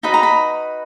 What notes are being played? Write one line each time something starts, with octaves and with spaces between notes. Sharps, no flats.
D#4 F#4 B4 D#5 B5
A#5
B5